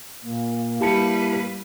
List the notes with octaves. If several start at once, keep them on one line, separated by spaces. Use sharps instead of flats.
A#2 A#3
G3 E4 G4 B4 A5 C#7